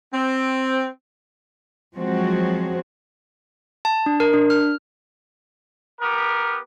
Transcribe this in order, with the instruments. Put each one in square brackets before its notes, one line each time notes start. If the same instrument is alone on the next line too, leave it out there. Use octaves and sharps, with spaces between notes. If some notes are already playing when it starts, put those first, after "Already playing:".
[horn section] C4
[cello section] F3 F#3 G#3 C4 F#4
[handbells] A5
D4
A#4
D4
F6
[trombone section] B3 G4 A#4